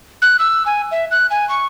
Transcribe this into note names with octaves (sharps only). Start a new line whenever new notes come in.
F#6
E6
G#5
E5
F#6
G#5
C#6